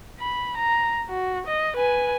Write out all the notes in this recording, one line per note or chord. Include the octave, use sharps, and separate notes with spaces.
B5
A#5
F#4
D#5
B4 G#5